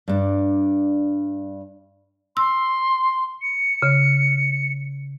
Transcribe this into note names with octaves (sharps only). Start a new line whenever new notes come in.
G2 D4
C6 E6
C#7
C#3